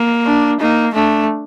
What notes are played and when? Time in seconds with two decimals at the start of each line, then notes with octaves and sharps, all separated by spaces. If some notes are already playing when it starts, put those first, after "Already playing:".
Already playing: A#3
0.26 D4
0.60 A#3 D#4
0.94 A3 D4